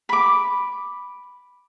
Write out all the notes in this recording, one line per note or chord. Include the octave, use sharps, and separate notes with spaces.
B5 D6